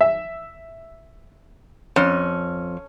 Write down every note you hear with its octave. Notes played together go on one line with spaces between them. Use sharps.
E5
F2 C#4